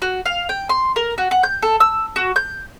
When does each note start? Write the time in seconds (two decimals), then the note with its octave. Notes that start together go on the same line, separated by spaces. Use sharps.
0.02 F#4
0.26 F5
0.49 G5
0.69 C6
0.96 A#4
1.18 F#4
1.31 F#5
1.43 G6
1.62 A4
1.80 E6
2.16 F#4
2.36 G6